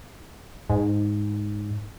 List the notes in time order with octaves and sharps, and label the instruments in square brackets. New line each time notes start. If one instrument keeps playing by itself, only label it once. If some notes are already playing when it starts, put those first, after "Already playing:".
[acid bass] G#2